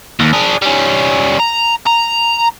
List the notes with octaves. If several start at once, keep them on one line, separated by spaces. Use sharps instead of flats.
D#2
D4 G#4
G3 C#4
A#5
A#5